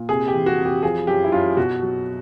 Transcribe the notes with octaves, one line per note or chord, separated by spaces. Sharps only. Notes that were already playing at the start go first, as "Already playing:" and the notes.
Already playing: A#2
C3 G#4
G4
E3
F#4
F2
G4
F3 G#4
F#2 G4
E4
F#2 F4
B2 F#4
F#3